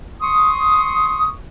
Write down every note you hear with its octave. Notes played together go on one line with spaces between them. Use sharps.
C6 C#6 D#6